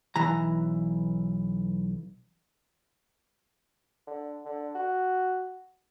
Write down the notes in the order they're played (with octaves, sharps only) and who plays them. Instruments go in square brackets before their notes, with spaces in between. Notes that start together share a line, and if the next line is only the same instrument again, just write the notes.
[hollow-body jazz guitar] B1 E3 A#5
[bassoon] D3
D3
F#4